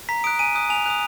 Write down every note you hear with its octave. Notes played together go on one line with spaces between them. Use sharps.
A#5 B6
D#6 F#6 D7
G#5 D#7
D#6 F#6
G#5 F7
D#6 F#6 F7